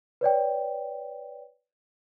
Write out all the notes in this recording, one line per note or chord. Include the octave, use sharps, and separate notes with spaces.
B4 C#5 D5 G5